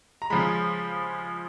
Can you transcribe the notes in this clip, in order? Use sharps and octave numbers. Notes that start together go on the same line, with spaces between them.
A#5
C#3 F3 G#3 B5